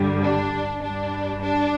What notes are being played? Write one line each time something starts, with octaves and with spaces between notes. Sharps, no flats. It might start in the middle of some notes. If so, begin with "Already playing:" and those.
Already playing: G2 D3 G3
D4
G2 G3 D4
D4